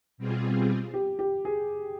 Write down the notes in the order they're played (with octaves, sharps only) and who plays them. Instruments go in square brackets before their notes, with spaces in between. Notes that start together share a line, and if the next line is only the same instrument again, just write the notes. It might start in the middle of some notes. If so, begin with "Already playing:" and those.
[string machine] B2 G3 C4 F4 G#4
[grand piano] G4
G4
G#4